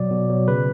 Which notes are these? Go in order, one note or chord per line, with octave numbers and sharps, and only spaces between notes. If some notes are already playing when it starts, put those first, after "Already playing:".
Already playing: B2 F#3 D5
B2
F#3
C#3 B4